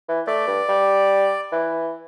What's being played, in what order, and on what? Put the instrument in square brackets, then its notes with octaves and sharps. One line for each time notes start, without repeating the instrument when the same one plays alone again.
[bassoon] E3
[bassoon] A3 [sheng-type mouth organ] D5
[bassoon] G2
G3
E3